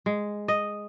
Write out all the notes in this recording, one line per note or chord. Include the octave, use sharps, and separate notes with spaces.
G#3
D#5